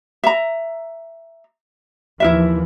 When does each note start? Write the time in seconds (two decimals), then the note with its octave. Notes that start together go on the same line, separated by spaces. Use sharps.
0.24 E5 A#5
2.20 D#2 E3 F3 E4 A#4 E5